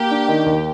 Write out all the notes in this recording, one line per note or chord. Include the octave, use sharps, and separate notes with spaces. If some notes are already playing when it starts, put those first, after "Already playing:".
Already playing: A#3 G4
D4
D#3
D#2